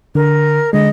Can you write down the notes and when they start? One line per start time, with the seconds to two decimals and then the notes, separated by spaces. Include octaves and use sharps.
0.15 D3 A#4
0.73 D3 G#3 D#5